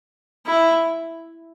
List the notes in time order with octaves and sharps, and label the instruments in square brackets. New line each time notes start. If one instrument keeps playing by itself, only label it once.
[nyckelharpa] E4